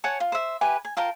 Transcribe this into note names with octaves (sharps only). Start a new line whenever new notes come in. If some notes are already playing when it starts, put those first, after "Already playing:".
C#5 F#5 G#5 A5
F4
C5 E5
E4 G4 B4 G#5
G#5
F4 A#4 G5 A5